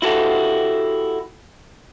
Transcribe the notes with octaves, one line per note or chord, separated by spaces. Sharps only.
E4 F#4 G4 A4